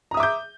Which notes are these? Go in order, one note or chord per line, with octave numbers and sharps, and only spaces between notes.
E5 A#5 D6 D#6 G6